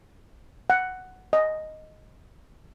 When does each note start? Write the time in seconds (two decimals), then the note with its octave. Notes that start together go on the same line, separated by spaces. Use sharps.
0.70 F#5
1.33 D#5